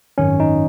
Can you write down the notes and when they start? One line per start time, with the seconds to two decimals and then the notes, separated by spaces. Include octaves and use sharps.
0.18 G#1 F#2 D#3 C#4
0.40 D#4